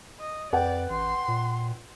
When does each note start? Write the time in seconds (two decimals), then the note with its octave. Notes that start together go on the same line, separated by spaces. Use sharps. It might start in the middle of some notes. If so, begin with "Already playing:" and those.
0.20 D#5
0.53 F2 B4 D5 F#5 G5
0.90 A1 C6
1.28 A#2